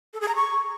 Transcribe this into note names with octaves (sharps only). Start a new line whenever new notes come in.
A4
G#4
A#5
C#6